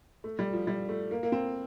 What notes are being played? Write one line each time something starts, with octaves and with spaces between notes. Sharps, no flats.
A3
G3
F3
G3
A3
A#3
A#3
C4